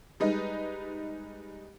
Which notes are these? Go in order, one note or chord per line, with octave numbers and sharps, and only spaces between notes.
G3 G#3 D#4 B4 D#5